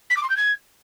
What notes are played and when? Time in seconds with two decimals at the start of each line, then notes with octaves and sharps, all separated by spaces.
0.10 B6
0.17 D6
0.23 C6
0.30 G6
0.37 G#6